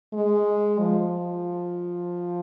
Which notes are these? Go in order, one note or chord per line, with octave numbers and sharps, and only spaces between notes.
G#3
F3